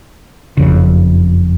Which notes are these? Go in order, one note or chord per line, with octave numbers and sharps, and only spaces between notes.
F#1 F2 C#3